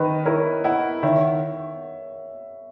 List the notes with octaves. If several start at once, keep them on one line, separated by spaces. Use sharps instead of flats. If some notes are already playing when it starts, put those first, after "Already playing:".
Already playing: D#3 B4 D#5
E4 A#4 C#5
E4 D#5 F#5
D#3 C#5 E5